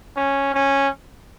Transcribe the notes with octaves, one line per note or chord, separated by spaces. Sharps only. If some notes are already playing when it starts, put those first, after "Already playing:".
C#4
C#4